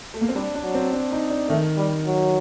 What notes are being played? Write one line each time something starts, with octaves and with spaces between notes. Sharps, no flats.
A3
A#3
C4
G3 D4
D4
F#3
C4
D4
D#4
D4
D#3 A3
G3
F#3